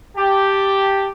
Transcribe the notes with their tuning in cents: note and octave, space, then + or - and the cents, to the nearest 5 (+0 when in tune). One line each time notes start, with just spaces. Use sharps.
G4 +0 A5 +0